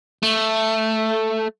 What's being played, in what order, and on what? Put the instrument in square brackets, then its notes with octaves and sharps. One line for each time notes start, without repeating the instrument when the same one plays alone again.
[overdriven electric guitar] A3